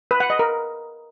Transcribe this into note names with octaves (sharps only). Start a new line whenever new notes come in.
B4
F#5
D#5
A#4